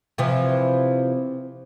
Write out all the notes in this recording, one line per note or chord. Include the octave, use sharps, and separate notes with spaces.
C3 E3 F3